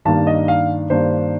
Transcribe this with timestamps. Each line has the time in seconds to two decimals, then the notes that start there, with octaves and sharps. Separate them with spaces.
0.05 G2 D#3 A#3 D4 A5
0.27 D#5
0.48 F5
0.90 G2 D#3 A#3 D4 C5